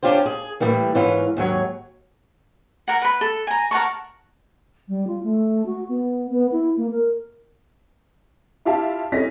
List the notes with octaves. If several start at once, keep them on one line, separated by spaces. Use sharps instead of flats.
C#4 D4 F4 G4 C5
G#4
A2 E3 G3 A#3
G#2 E3 C#4 F4
D#2 G#2 F#3 C#5
A#4 F#5
B4 B5
A4
G#5 A#5
A#4 F#5 A5 C#6
G3
F4
A3
F#4
B3
B3
E4
A#3
A#4
E4 F4 G4 E5 F5 A5
C#4 E4 A4 D#5 A#6 B6